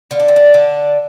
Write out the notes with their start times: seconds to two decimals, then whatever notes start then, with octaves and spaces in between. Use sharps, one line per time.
0.11 D3 F4
0.20 D4
0.28 C4
0.36 D4
0.54 D3